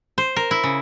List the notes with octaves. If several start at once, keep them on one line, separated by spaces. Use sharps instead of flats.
C5
A#4
E4
C#3